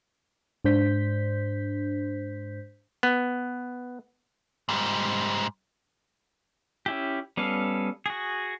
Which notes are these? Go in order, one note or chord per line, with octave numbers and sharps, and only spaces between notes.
G#2 D4 C5 G6 B6
B3
G#2 G3
C#4 E4 G4
G3 B3 C#4 A4 F5
F#4 G#4